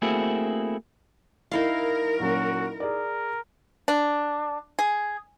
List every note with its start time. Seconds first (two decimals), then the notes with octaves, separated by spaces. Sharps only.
0.02 A3 A#3 C4 E4 F#4 G#4
1.51 D#4 E4 A#4 F5
2.20 A#2 F#3 C#4 F#4
2.80 G#4 A#4 D5
3.88 D4
4.79 G#4